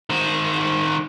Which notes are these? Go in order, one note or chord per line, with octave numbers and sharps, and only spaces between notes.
D#3 C5